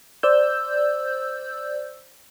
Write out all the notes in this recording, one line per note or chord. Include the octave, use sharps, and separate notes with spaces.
C5 D5 E6 G6